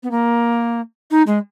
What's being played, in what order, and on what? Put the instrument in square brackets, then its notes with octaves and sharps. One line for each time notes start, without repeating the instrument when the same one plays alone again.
[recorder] B3
A#3
D#4
G#3